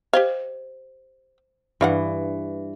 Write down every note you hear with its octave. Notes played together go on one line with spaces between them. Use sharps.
G4 C5 D#5 F5
G2 E3 D4 F5 F#5